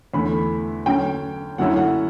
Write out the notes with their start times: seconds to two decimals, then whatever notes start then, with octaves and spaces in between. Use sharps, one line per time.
0.14 E2 D3 A3 B5
0.86 D3 F#3 C#4 G5
1.58 F#2 D3 F#3 C#4 E4 F#5
1.77 F#5